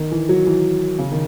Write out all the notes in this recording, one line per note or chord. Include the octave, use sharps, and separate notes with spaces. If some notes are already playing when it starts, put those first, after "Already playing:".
Already playing: D#3
E3
F#3
E3
C#3
D#3